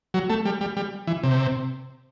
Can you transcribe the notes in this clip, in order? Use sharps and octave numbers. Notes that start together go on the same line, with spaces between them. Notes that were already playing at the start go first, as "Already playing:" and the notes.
F#3
A3
G3
G3
G3
E3
C3